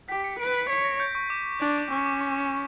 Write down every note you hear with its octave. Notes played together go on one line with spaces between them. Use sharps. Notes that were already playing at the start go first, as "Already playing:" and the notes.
G4 B6
C#7
B4 D7
B6
C#5 B6
A#6
G6
C#6
D6
D4
D6
C#4 C#6
D6
C#6